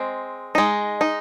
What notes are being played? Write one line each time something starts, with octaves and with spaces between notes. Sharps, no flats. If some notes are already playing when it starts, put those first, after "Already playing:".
Already playing: G#3 C4
G#3 D#4
D#4